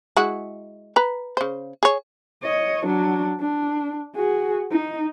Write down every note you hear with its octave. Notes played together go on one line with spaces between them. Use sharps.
G#3 E4 F#4
B4 A#5
C#3 C5
G#4 C#5
C#5 D#5
F#3 D4
D4
F#4 G#4
D#4